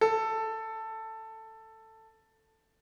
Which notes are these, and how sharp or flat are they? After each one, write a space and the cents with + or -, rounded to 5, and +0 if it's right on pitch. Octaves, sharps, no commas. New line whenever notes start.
A4 +10